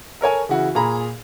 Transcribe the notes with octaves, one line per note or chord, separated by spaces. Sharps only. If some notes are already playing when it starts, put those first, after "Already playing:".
A4 A#4 C#5 G#5
C#3 E3 E4 F#4
A#2 G#4 A#5 B5